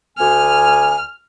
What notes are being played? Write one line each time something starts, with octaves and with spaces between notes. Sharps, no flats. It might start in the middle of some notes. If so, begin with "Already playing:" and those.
D2 G#5 F6